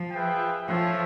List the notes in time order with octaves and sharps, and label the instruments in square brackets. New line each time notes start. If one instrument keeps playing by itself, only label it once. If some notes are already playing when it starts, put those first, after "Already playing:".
Already playing: [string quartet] F3
[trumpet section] F4 G#4 B4 E5 G5
[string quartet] F3 [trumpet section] F4 A4 C#5 E5 G5